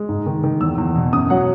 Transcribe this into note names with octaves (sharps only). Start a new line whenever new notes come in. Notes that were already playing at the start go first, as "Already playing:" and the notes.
Already playing: G#3
G#2
D#3
D#3
E2 E6
E2
B2
F#2 D#6
F#3 F#5